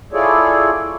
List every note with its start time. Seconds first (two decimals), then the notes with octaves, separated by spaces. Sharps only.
0.13 E4 F4 G#4 A4 C#5 D5